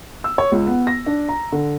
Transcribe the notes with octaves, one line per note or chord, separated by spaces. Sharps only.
E6
C#5
C#2
B3
A#6
D4
A#5
D3